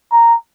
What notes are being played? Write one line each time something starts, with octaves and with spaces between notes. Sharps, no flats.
A#5